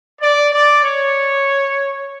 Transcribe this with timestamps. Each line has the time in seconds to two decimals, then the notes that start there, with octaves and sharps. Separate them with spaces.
0.22 D5
0.53 D5
0.84 C#5